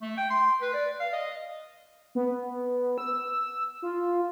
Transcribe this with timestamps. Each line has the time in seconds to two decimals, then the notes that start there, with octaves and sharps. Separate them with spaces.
0.02 A3
0.17 G5
0.30 C6
0.61 B4
0.74 D5
1.00 F5
1.13 D#5
2.15 B3
2.98 E6
3.82 F4